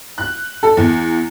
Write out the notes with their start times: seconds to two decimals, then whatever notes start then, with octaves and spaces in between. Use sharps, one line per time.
0.18 F#6
0.63 A4
0.77 E2